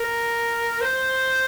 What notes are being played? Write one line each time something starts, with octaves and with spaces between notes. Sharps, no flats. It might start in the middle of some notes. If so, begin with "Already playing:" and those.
Already playing: A#4
C5